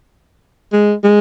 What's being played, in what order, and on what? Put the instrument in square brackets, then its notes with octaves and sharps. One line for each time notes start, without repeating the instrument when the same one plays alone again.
[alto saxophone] G#3
G#3